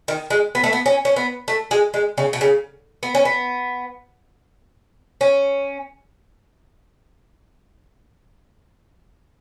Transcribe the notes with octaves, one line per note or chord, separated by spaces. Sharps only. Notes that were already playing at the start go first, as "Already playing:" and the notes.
D#3
G#3
B3
A3
B3
C#4
C#4
B3
A3
G#3
G#3
C#3
B2
C#3
B3
C#4
B3
C#4